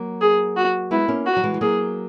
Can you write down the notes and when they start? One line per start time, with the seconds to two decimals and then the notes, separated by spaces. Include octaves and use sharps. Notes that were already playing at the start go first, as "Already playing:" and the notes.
Already playing: F#3 A#3
0.21 G#4
0.57 F#4
0.91 G#3 B3 E4
1.08 A#3 C#4
1.26 F#4
1.37 F#3
1.44 E3 G#3
1.54 G#3
1.61 F#3 A#3 G#4